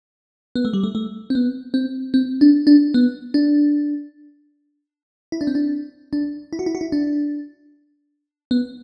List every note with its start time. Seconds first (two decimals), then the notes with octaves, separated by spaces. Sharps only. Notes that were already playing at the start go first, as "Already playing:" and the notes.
0.56 B3
0.65 A3
0.73 G3
0.83 A3
0.95 A3
1.30 C4
1.35 B3
1.74 C4
2.14 C4
2.41 D4
2.67 D4
2.94 B3
3.34 D4
5.32 E4
5.41 D4
5.47 C4
5.55 D4
6.13 D4
6.53 E4
6.59 F#4
6.66 E4
6.75 F#4
6.81 E4
6.92 D4
8.51 B3